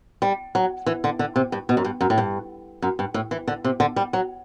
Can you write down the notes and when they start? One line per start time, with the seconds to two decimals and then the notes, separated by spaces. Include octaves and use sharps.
0.22 G3
0.55 F#3
0.86 E3
1.04 D3
1.19 D3
1.36 C3
1.52 G2
1.69 B2
1.77 F#2
1.84 G2
2.01 F#2
2.10 A2
2.18 G2
2.82 F#2
2.99 G2
3.14 A2
3.31 E3
3.48 D3
3.64 C3
3.80 D3
3.96 G3
4.13 F#3